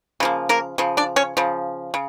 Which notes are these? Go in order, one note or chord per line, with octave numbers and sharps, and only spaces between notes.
C#3 F3 A#3
A#3 A#4
C#3 F3
D4 D5
C#4 C#5
C#3 F3
C#3